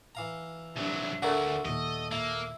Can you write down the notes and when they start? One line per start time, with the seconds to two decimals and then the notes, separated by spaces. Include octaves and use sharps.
0.15 E3 F5 A#5
0.76 C2 F#3 D4 E5
1.22 D2 D4 E4 F#4 A4 A#4 D5 F#5
1.65 D#2 A#2 A4 D#5
2.12 A#3 E4